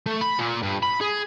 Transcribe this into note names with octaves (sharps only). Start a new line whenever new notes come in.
A3
B5
A#2
G2
B5
G#4